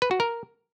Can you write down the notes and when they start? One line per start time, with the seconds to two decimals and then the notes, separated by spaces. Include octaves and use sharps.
0.02 B4
0.11 F#4
0.20 A#4